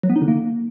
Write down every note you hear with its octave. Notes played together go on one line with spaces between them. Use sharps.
F#3
B3
D#4
D3
A#3